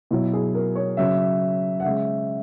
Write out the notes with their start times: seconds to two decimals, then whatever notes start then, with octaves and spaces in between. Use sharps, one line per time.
0.11 B2 F#3 E4
0.33 G#4
0.55 A#4
0.76 C#5
0.97 C#3 F#3 E5
1.80 F#5
1.84 C#3 G#3 E5